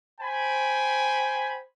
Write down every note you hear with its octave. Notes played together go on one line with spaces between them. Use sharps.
C5 G5 G#5 B5